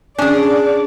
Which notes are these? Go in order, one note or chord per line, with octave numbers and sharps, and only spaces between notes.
C#4 D4 G#4 D5